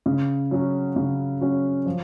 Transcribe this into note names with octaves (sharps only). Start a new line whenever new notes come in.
C#3
F#3 C#4 F#4
C#3
F#3 C#4 F#4
F3